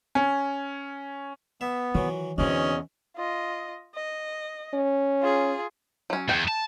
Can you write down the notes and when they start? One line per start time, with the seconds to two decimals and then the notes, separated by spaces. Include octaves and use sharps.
0.15 C#4
1.61 B3 E5
1.95 D#3 E3 F#3 F4
2.38 E2 B2 D3 E3 C4 C#4 D#4 D#5
3.16 F4 D#5
3.95 D#5
4.74 C#4
5.22 F4 G#4
6.10 F#3 C#4
6.29 E2 G5
6.48 A5